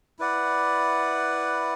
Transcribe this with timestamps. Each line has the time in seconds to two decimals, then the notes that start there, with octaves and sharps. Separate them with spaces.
0.19 E4 B4 D5 F#5